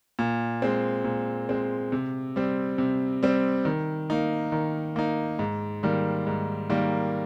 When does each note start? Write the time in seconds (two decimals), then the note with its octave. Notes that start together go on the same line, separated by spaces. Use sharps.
0.19 A#2
0.62 G#3 C4
1.04 A#2
1.49 G#3 C4
1.92 C3
2.36 G3 C4
2.78 C3
3.23 G3 C4
3.65 D#3
4.10 A#3 D#4
4.52 D#3
4.96 A#3 D#4
5.39 G#2
5.83 D#3 G3 A#3
6.27 G#2
6.70 D#3 G3 A#3